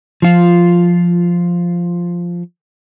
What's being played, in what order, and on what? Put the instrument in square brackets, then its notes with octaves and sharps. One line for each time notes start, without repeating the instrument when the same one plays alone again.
[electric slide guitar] F3 F4